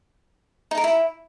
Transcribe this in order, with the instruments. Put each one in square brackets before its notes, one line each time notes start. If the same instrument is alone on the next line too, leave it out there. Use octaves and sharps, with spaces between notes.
[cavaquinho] D#4
A#4
E4